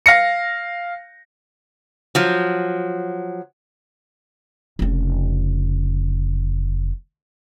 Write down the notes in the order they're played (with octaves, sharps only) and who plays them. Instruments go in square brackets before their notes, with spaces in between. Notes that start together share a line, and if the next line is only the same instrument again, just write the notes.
[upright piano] F5 A#6 C#7
[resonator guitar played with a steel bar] F3 F#3
[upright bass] F1 C#3